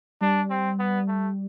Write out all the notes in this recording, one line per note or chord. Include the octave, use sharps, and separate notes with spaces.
G3 D4
C4
B3
A3